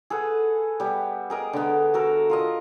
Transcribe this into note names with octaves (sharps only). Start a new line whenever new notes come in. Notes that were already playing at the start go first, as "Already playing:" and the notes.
G#4 A4 B4 F#5
G3 B3
G#4 A#4 D#5
D3 B3
F#4 A4 A#4
F4 A#4 D#5